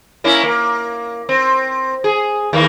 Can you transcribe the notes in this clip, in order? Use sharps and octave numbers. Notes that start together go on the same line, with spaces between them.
A#3 C#4 E4
A#3
C4
G#4
D#2 E3 A#3